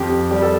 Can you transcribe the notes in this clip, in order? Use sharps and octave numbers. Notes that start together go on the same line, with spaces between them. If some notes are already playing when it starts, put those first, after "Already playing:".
Already playing: F2 G4
G3 G4
A4